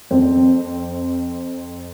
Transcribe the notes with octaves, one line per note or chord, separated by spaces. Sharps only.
F2 C4